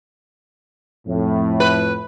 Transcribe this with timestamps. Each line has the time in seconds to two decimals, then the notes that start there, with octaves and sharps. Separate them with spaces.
1.07 F2 A2
1.60 B4